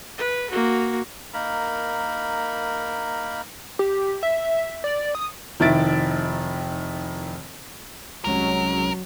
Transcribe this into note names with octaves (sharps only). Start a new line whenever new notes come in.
B4
A#3 F#4
A#3 D#4 A#4 B5
G4
E5
D5
D#6
F1 D#3 E4 E5 A6 D7
C2 F#3 G#3 C#4 A#4